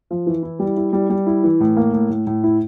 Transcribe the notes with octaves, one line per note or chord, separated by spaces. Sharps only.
F3
E3
E4
G3
E4
G3
G3
E4
E3
A2
A#3
A2
A2
A2
E4